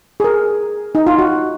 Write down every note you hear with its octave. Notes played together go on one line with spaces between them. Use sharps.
G#4
A#4
D#4
F4
F#4